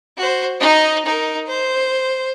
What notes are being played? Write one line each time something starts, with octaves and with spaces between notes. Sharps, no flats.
F#4 C5
D#4 D#5
D#4 A#4
C5